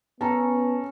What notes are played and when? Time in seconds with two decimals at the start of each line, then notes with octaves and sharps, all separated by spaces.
0.21 B3 C#4 A4 A5 A#5